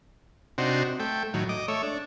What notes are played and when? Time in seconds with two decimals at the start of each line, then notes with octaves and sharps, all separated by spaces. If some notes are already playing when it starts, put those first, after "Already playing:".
0.58 C3 D4 D#4 F#4 C5
1.00 A3 G5
1.34 A2 D#3 F#3
1.49 D#5 D6
1.68 A3 C#5 E5
1.83 D4